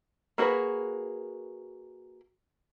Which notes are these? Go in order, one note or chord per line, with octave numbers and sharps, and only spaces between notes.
A#3 F#4 G#4 A4 B4